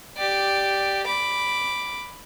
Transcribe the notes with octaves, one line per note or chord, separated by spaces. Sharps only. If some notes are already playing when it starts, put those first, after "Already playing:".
G4 D5
B5 D6